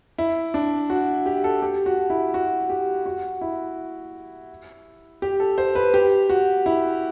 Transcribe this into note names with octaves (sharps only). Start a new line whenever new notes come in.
E4
D4
F#4
G4
A4
G4
F#4
E4
F#4
G4
F#4
E4
G4
A4
C5
B4
G4
F#4
E4